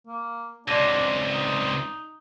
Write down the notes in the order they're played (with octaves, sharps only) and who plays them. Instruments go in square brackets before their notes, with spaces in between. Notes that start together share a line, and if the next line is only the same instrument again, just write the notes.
[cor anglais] A#3
[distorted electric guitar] C#2 C3 [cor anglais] D4 [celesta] D5 A#6
[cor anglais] D#4